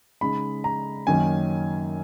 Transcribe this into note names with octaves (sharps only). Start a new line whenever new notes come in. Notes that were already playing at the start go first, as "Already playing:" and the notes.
C#3 G#3 D#4 B5
A#5
F#2 D#3 A#3 C#4 G#5